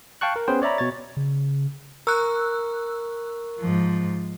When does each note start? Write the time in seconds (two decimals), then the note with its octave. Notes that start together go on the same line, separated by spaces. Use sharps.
0.21 F5 G5 A5 C#6 F#6
0.36 A#4
0.48 B3 C#4 G#4 B4 C5 G5
0.62 C#5 D5 E5 A#5 B5
0.78 B2 C#5 A6
1.17 C#3
2.07 A#4 C#6 E6 F#6
3.59 G#2 F3